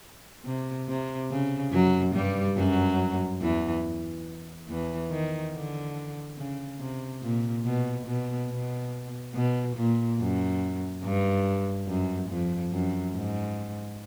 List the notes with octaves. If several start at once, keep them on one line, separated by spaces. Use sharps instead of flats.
C3
C3
C#3
F#2 F#3
G2 G3
F#2 F#3
E2 E3
E2 E3
D#3
D3
C#3
C3
A#2
B2
B2
B2
B2
A#2
F#2
G2
F#2
F2
F#2
G#2